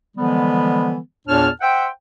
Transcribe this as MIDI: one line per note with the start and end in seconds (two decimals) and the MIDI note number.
0.17 0.97 50
0.17 0.97 52
0.17 0.97 53
0.17 0.97 55
0.17 0.97 56
0.17 0.97 59
1.27 1.48 40
1.27 1.48 46
1.27 1.48 62
1.27 1.48 73
1.27 1.48 81
1.27 1.48 89
1.61 1.88 72
1.61 1.88 76
1.61 1.88 78
1.61 1.88 79